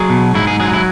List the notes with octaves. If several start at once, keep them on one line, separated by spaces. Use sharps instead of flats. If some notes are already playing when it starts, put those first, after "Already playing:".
Already playing: F#3 G#4
B2
G#2 E4
G#4
F#3 G#4
E4